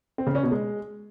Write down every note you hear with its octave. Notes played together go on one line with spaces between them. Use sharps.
C4
C#3
C#4
B2
G#3